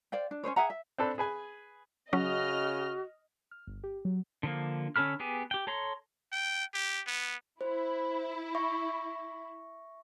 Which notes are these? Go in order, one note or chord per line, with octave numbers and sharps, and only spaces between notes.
C5 D5 F5 G5
D4
C#4 D#4 C5 C#5
G#4 E5 F#5 A#5
E5
C4 D4 A4 B4
G#4 B4 G#5
C#3 F#3 C#4 F#4 D#5 F6
F6
G1
G4
F#3
D3 F3 A#3
D3 C#4 A4 B5 F6
B3 G4 G#4
G4 G5
A4 C#5 A#5 C6
G5
G4
B3
E4 C5
E5 C#6